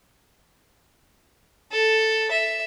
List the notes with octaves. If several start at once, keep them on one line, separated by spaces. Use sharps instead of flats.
A4
E5